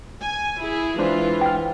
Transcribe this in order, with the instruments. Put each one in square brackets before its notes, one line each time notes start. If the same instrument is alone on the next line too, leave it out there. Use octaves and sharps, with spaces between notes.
[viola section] G#5
[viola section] E4 [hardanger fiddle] G#4
[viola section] E3 [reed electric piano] G#3 D4 C5 [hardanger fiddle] F4
[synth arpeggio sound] G5 F6